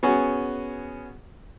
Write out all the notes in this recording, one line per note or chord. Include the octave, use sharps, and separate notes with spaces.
B3 C#4 F#4 G#4